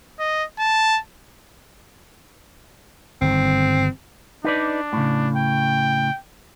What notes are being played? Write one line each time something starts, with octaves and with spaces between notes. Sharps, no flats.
D#5
A5
G1 D#3 C4
D4 D#4 B4 D5
A2 C#3
G5